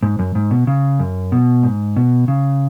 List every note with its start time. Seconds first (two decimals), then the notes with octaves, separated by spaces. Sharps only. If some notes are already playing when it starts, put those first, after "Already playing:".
0.03 G#2
0.19 F#2
0.35 G#2
0.51 B2
0.67 C#3
0.99 F#2
1.32 B2
1.63 G#2
1.96 B2
2.28 C#3